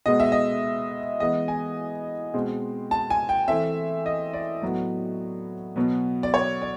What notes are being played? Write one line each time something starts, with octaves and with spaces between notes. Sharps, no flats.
B2 G#3 B3 D#5
E5
D#5
E3 G#3 B3 D#5
G#5
B2 G#3 C4
A5
G#5
G5
E3 A3 C4 E5
D#5
D5
A2 F#3 B3
B2 F#3 B3
D5
C#5
D5